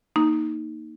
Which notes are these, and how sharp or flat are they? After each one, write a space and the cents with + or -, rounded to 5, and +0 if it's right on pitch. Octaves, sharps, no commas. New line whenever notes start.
A#3 +0 D#4 +0